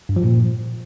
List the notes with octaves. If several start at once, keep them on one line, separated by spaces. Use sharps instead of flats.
G2
F3
A#2